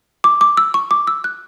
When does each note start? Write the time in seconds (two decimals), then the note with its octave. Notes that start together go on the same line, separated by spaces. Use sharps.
0.24 D6
0.41 D6
0.57 E6
0.74 C#6
0.91 D6
1.07 E6
1.24 F#6